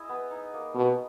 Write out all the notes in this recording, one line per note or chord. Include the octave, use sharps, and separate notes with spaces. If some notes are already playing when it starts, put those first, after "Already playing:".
Already playing: E4 G#4 D#5
B3
D#4
A#3
B2 B3